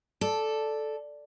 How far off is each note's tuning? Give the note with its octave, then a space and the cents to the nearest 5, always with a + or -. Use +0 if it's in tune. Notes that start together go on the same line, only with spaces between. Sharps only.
A4 -5 D5 +0